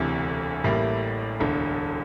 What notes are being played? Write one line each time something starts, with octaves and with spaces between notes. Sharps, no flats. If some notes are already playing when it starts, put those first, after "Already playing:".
Already playing: E1 D2 C3 E3
A1 A2 G3 A#3 E4
E1 D2 D3